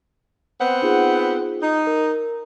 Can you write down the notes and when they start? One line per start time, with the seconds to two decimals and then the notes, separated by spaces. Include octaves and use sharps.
0.60 B3 C4 F#5
0.82 D#4 F4 G#4
1.62 D#4
1.87 A#4